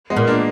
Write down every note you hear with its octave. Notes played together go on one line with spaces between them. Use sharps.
G#3 B3
A#2
A#3 D4